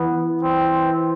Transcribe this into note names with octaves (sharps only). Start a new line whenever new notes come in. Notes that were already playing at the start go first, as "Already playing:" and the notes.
Already playing: E3 B3
C4